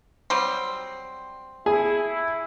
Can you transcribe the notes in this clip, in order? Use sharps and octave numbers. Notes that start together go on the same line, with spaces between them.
F#3 G3 C4
E4 G#4